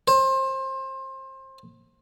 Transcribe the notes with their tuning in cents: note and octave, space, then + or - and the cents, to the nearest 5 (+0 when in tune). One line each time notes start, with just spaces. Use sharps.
C5 +25